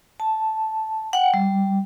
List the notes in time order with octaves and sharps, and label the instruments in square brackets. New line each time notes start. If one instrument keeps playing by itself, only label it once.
[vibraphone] A5
F#5 G5
G3